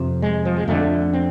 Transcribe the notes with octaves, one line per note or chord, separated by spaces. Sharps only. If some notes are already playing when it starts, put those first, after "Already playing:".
Already playing: F2 C3
G#3
F3
G#3
F2 D3 A3
C4